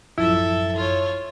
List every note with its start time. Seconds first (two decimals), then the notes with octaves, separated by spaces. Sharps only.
0.18 A1 F#2 F3 E4 A4 E5
0.76 F4 C#5